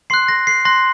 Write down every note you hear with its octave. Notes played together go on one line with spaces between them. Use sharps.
C6 F#6 C7
A#6
C7
C6 F#6 A#6